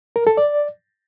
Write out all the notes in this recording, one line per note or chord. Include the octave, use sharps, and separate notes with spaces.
A#4
A4
D5